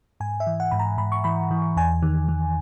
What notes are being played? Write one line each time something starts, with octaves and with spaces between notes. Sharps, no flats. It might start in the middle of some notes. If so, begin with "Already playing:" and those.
G#2 G#5
E5
E3
F#5
G#2 B5
A#5
G#2 B5
C#6
E3 B5
E3
E2 G#5
D#3
D#3